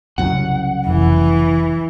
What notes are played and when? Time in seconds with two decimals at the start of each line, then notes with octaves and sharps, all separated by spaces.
0.18 C2 F#2 C#3 F#5
0.87 F1 E3